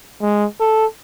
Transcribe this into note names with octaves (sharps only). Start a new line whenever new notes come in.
G#3
A4